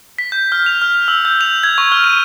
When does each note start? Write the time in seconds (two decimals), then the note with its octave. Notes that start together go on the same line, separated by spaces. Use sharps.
0.18 B6
0.32 G6
0.52 F6
0.66 F7
0.82 F6
1.08 E6
1.25 G6
1.41 F7
1.63 G#6
1.78 C#6
1.92 F6
2.04 D#7